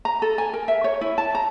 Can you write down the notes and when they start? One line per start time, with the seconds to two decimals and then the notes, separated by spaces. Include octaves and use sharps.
0.05 A#5
0.22 A4
0.38 G#5
0.53 A#4
0.68 E5
0.84 C#5
1.01 E4
1.18 A5
1.35 A#5